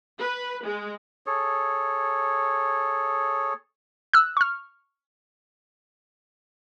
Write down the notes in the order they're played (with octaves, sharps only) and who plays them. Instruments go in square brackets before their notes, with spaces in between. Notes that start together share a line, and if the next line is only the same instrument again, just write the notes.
[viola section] B4
G#3
[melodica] G#4 A4 C#5
[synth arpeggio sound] E6 F#6
C#6 F6